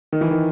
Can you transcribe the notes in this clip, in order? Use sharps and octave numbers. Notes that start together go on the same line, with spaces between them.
D#3
E3
D#3